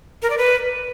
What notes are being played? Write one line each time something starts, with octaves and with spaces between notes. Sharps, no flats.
A#4
D5
B4